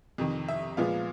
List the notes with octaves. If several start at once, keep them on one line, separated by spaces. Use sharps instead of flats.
F2 C3 D#3
E5
A#2 F3 G#3 B3 F5